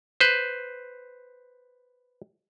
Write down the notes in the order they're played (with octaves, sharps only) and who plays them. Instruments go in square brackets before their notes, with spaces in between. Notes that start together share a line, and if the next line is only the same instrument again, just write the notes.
[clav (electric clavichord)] B4 C5